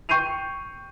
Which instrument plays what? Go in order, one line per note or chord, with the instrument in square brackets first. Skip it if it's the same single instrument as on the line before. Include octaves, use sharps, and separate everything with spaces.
[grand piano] G5 C#6 G6 C7 D#7 F7